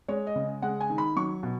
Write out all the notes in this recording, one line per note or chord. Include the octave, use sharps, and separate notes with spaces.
G#3 C#5
D#5
C#3
G#3 F#5
G#5
D#3
B5
F#3 C#6
B2